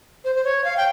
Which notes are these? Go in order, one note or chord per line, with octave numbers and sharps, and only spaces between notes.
C5
C5
C#5
F5
G5